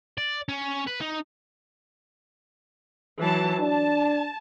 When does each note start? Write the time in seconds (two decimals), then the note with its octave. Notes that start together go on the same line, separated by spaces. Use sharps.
0.18 D5
0.49 C#4
0.87 B4
1.01 D#4
3.18 E3 F#3 A5
3.60 D4 A5